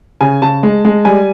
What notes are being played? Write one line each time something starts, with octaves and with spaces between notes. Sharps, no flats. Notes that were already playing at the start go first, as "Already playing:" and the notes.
C#3 G#5
C#3 A5
G#3
G#3
G3 G#5